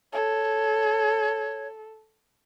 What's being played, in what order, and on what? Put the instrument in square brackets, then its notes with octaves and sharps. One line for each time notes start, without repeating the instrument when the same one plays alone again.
[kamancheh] A4 [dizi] C#5